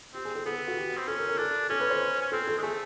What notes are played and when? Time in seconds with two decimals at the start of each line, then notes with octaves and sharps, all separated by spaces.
0.14 C4 G4
0.25 G#4
0.35 A4
0.45 B3 A4
0.68 F#4
0.77 G4
0.98 C4
1.08 C#4 A4
1.18 A#4
1.28 A#4
1.38 D4 A4
1.70 C#4 A4
1.80 B4
1.90 C5
2.01 C5
2.22 C#4
2.32 C4 A4
2.47 A4
2.58 G#3
2.62 A3 G#4